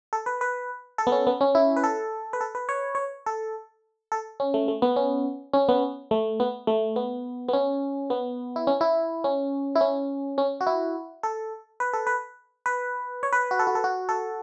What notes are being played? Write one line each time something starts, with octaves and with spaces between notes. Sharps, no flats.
A4
B4
B4
A4
B3
C#4
B3
C#4
E4
B4
A4
B4
A4
B4
C#5
C#5
A4
A4
C#4
A3
A3
B3
C#4
C#4
B3
A3
B3
A3
B3
B3
C#4
B3
E4
C#4
E4
C#4
E4
C#4
C#4
F#4
E4
A4
B4
A4
B4
B4
C#5
B4
F#4
A4
F#4
A4
F#4
A4